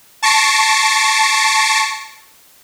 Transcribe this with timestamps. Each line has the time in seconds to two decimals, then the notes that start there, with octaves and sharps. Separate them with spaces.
0.23 A5 C#6 A#6 C7 D7